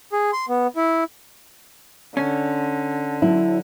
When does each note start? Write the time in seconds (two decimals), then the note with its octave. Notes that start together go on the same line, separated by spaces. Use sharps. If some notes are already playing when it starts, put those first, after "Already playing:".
0.12 G#4
0.33 C6
0.49 B3
0.76 E4
2.17 D3 C#4
3.22 F#3 E4